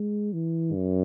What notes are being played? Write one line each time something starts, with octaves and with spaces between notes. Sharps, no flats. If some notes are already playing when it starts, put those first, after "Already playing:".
Already playing: G#3
E3
F#2